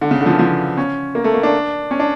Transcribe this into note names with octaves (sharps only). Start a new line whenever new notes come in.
D3
C#3
D3
F3
E3
F3
C#4
A#3
A3
A#3
D4
C#4
D4